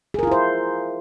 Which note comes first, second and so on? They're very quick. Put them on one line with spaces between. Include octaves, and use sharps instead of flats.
G#4 A#4 F4 E4 C5